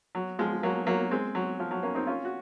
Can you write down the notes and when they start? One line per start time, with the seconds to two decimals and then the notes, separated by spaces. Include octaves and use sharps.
0.15 F#3
0.39 F3 G#3
0.63 F#3 A#3
0.86 F#3 A#3
1.11 G#3 C4
1.35 F#3
1.60 F3
1.71 F#3
1.83 A#3 C#4
1.95 C4 D#4
2.07 C#4 F4
2.25 F#4